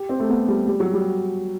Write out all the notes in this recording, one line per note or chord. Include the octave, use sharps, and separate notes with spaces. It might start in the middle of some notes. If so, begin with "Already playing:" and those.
Already playing: G4
C4
A3
B3
G3
G3
F#3
G3